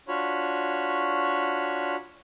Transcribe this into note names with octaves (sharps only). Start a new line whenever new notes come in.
D4 F4 F#4 C#5 B5